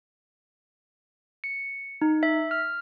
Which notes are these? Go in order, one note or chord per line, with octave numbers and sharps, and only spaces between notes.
C#7
D#4
E5
F6